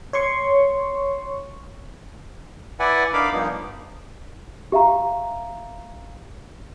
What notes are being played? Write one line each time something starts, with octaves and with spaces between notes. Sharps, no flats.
C#5 C6 C#6
E4 B4 D5 F#5 G#5
D4 D#4 A#4 F5 B5 D6
G2 A#2 F3 A#3 B3 D#4
G4 E5 F5 A#5